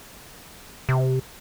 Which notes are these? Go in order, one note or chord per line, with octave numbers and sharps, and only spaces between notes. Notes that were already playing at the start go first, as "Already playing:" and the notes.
C3